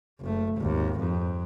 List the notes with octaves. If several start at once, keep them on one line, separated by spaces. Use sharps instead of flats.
F#1 A3
G#1 D#2
F2